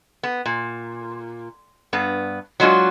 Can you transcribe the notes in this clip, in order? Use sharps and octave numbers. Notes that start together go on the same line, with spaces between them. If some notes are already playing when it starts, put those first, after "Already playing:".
B3
A#2
G2 B3
F#3 G#3 D4 F4 F#4